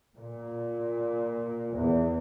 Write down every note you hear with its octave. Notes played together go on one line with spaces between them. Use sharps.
A#2
E2